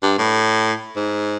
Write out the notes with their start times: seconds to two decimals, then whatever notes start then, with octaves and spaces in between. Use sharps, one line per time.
0.03 G2
0.18 A2
0.96 G#2